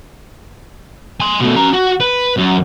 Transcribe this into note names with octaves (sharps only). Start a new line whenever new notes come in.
G#5 C6
B2 A3
C#4 A#5
F#4
B4
F#2